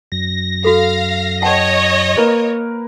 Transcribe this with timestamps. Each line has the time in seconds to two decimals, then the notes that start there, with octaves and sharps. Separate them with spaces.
0.12 F#2 A#6
0.65 F#4 A4 F5
1.42 C#5 D#5 F#5 G5 A5
2.17 A#3 A#4 B4